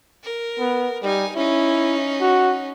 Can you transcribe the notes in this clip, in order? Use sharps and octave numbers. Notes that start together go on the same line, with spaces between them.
A#4
B3
G3 D#4 G#5
C#4 D#4 E4
F#4